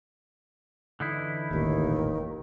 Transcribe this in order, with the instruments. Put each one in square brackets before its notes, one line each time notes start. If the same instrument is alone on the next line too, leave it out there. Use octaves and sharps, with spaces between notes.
[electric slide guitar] D3 D#4 E4 [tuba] E3
[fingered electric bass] E1 A1 A#2 [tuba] D#2 [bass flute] D#3